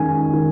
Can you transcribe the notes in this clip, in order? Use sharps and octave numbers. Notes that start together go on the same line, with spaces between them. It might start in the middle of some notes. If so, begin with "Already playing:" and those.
Already playing: D#3 G#3 C#4 G#5
D#3